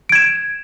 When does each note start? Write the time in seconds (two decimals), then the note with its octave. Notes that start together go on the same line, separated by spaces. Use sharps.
0.09 D7
0.12 G#6
0.15 E7